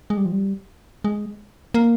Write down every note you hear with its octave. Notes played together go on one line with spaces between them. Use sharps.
G#3
G3
F3
G3
G#3
A#3